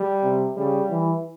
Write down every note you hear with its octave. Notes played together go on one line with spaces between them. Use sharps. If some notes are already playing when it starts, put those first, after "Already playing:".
Already playing: G3
C3
C#3 G3
E3